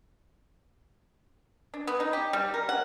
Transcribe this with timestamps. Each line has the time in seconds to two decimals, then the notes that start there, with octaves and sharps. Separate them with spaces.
1.74 D4
1.87 B3
2.00 D#4
2.13 G4
2.33 G3
2.54 A#4
2.69 F#5